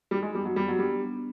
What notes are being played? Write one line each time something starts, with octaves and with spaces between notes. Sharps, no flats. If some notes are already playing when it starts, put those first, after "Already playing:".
G3 D#4
G#3
G3 B3
F#3
G3 G4
F#3
G3 D4
B3